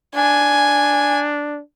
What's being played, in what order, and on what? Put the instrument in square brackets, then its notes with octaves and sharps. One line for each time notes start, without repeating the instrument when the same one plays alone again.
[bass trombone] D4 [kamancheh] G#5